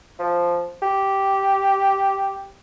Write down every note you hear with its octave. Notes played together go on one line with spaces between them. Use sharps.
F3
G4